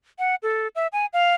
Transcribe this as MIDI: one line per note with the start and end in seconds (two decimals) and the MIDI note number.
0.19 0.35 78
0.43 0.68 69
0.75 0.87 76
0.93 1.06 80
1.13 1.35 77